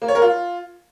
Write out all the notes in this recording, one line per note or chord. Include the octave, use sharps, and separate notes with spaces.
A#3
C#5
A#4
F4